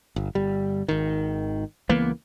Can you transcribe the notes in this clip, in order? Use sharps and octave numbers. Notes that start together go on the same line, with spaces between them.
G1
G1 G3
G#1 D#3
C#2 E3 A#3 B3